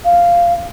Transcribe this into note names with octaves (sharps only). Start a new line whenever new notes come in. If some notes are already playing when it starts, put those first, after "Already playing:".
F5